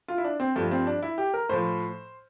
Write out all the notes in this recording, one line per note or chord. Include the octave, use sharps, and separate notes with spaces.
F4
E4
D4
C4
G2 F3 A3
C4
D4
E4
G4
A#4
A2 F3 C5